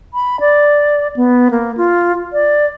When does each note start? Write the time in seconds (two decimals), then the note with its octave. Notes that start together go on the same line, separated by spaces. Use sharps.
0.14 B5
0.40 D5
1.16 B3
1.51 A#3
1.77 F4
2.33 D5